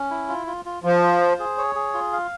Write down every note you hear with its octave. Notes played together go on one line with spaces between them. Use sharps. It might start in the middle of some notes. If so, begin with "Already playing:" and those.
Already playing: C#4
E4
F4
F4
F4
F3 F4
F4
C5
G#4
C#5
G#4
F4
F5